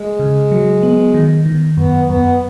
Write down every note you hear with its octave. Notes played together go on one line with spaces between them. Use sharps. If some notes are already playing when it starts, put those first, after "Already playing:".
Already playing: G#3
C#3
F#3
B3
D#3
D#3
F#2 B3
F#2 B3